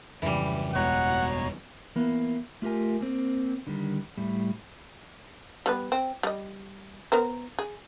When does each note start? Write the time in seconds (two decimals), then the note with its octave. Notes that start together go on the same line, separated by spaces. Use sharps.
0.22 F2 G#2 C#3 E3 G3
0.75 F#1 E2 B2 G#3 C#5 F#5 A#5
1.96 E3 A#3 B3
2.62 A3 F4 G4 A#4 G#5
3.01 A#3 C4
3.67 D3 D#3 G3
4.17 A2 G3
5.66 G3 B3 B4
5.92 C4
6.23 G3 D#5
7.12 B3 A#4 C5
7.59 G#4